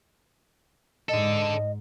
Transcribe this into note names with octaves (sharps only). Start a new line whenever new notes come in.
G#2 D4 A4 D#5